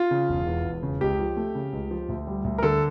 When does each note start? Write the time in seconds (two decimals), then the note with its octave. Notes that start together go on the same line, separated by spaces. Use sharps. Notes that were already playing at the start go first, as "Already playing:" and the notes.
Already playing: F4
0.11 C#3
0.29 E1
0.47 E2
0.65 E1
0.83 C#3
1.01 C#2 G4
1.19 F3
1.37 A3
1.55 C#3
1.73 C#2
1.91 F3
2.09 D2
2.27 G3
2.44 D2
2.58 A#4
2.63 D3 A4